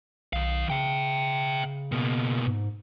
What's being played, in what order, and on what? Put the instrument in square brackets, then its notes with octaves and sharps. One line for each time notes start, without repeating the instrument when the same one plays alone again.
[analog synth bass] B1 [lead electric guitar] D#3 F5
[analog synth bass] C#3 [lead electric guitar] E5 G5
[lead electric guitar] B2 A#3
[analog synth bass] G#2